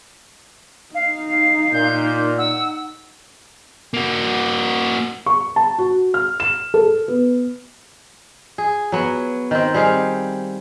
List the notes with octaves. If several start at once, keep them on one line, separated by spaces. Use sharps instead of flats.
D#4 F5
A#2 G6
F#5 E6
A#3 F#4
C#6
A5
F#4
F6
E7
A4
B3
G#4
F#3 B3
D#3 C4
G3 C4 G#4 F5